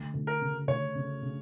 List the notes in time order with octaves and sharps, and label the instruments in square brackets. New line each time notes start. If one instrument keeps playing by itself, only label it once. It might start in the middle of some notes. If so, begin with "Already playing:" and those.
Already playing: [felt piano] D2
D2
[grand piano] A#4
[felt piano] C#3
[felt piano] D2 [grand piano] C#5
[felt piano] C#3
C#3